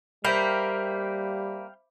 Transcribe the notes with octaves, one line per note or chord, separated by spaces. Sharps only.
G3 A#3 C5 E5 F5 G5 B5